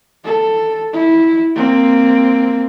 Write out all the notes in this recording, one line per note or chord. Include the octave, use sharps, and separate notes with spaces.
A4
E4
A#3 C4